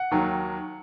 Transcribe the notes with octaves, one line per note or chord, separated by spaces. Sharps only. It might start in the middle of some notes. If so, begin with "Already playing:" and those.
Already playing: F#5
D#2 D#3 F#3